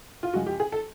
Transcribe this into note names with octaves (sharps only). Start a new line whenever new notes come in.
F4
F#2 C#3 F3 G#3 F#4
G4
G#4
A4